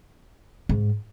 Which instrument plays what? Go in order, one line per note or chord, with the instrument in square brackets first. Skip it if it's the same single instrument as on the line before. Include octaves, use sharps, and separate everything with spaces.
[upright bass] G#2